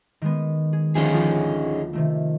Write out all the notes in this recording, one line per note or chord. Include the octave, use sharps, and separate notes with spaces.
D#3 G#3 B3
G#4
D2 F3 C#4 D#4 G#4 C7
F3 A3 F4
C3 D#3 A3